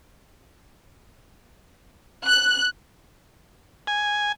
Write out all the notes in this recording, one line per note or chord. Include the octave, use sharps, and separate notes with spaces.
F#6
G#5